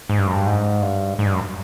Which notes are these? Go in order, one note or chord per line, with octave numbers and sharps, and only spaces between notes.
G#2
G2
F#2
G2
G#2
G2
G#2
G2
F#2